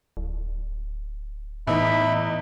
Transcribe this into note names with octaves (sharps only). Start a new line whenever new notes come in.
D1
E2 A2 D#4 E5 B5